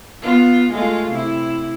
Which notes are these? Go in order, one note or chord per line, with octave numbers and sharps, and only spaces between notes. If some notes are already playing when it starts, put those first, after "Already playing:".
B3 F4
G#3 A3 F4
C3 E4